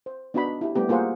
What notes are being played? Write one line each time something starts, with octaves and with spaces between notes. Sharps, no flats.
C5
B3 D4 D#4 F#4 D#5 B5
E4 G4
G3 A3 B3 G4
A#3 F4 G#4 C5 F#5